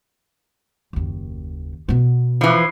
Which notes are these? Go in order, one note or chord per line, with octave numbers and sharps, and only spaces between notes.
F#1 D#2
B2 B3
E3 F3